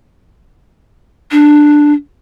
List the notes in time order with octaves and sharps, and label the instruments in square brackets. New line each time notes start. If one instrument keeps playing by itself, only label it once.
[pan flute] D4